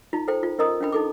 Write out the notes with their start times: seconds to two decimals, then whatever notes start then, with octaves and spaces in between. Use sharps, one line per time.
0.13 D#4 F4 A#5
0.28 A4 C5 G5
0.43 F4
0.58 C#4 A#4 D#5 A#5 D#6
0.80 C#4 D4 G5 B5
0.92 D#4 A4 D6